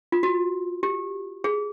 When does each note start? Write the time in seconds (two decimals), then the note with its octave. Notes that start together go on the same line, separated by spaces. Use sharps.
0.12 F4
0.23 F#4
0.83 G4
1.44 G#4